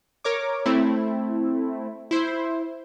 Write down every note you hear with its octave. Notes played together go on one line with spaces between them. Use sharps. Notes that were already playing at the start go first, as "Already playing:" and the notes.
A#4 C#5 D6
A3 C4 E4
E4 C5